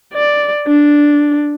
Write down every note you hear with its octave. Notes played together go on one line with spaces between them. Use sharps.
D5
D4